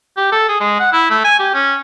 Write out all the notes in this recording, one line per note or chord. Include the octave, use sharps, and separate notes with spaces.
G4
A4
G#4
G#3
F#5
E4
A3
G#5
G4
C#4